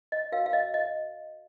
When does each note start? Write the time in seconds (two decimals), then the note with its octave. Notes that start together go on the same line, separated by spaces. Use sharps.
0.12 D#5
0.32 F#4 A#4 C#5 F5
0.46 F5
0.53 D#5
0.74 D#5